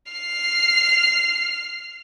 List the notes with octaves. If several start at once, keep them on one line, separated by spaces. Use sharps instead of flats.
F6 C7